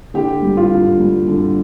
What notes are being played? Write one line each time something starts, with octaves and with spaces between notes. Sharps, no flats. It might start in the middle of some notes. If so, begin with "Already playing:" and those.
D3 G4
G3
F4
D3
G3
D3